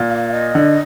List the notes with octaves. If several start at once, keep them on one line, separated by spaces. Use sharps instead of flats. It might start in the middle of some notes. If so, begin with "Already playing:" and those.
Already playing: A#2
F5
D#5
D3